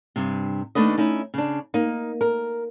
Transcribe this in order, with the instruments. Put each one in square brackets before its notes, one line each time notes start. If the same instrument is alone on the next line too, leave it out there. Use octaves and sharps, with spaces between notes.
[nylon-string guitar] G2 C3
D#2 G#2 A3 D4 B4 D#5
C#4 D#4 E4
C#3 D4
A#3 D#4
A#4